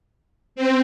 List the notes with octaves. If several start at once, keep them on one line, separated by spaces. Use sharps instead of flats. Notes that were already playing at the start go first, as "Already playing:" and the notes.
C4